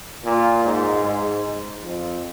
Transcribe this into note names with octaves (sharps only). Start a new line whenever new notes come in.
A#2
G#2
G#2
F2